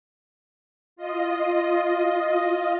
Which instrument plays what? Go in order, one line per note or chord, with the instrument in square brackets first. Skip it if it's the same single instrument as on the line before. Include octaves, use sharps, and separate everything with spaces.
[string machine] F4 D#5